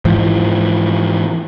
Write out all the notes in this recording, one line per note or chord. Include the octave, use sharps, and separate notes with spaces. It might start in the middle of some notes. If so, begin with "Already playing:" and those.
G#2 E3 F3